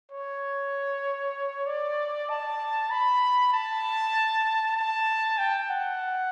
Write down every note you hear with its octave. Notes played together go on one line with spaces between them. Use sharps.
C#5
D5
A5
B5
A5
A5
G5
F#5